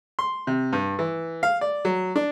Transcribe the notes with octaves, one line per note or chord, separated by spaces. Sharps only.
C6
C3
G2
E3
F5
D5
F#3
D4